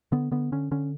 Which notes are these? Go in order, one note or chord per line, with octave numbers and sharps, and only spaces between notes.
D3 B3
D3 B3
D3 C#4
D3 C#4